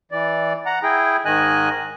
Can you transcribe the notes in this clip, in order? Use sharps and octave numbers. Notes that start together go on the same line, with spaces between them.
E3 D5
F#5 A#5
E4 G#4 G5
G#2 D#3 D#5 G#5 F#6